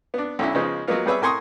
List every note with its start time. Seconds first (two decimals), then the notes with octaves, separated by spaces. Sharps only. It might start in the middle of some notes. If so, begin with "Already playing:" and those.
0.14 B3 D4
0.39 B1 C#4 D4 E4
0.55 C#3 F3 G#3 B3 D#4 C5
0.87 F#3 G#3 A#3 B3 F4
1.06 G3 B3 G#4 B4 C#5 E5
1.21 A2 A#4 G#5 C6 C#6 D#6